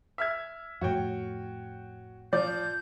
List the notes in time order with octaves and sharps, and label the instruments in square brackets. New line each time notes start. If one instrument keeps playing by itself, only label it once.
[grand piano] E5 F6 G#6
[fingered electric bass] F2 A2 [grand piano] F#4 C#5 G5
[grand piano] F3 D5 [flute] G6